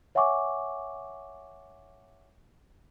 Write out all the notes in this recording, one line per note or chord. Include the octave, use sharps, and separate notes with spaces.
C#5 E5 F#5 G#5 C#6 D6